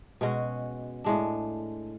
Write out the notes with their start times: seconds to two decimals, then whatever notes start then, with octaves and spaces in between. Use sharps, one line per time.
0.21 B2 G#3 C#4 F#4
1.04 A2 G#3 D4